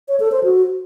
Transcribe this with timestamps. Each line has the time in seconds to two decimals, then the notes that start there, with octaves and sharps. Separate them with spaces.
0.08 C#5
0.20 A4
0.32 C5
0.44 F#4